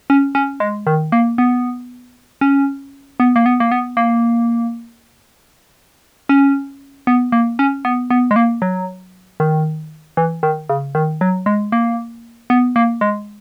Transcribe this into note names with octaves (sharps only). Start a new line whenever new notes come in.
C#4
C#4
G#3
D#3
A#3
B3
C#4
B3
A#3
B3
A#3
B3
A#3
C#4
B3
A#3
C#4
B3
B3
G#3
A#3
F#3
D#3
E3
D#3
C#3
D#3
F#3
G#3
A#3
B3
A#3
G#3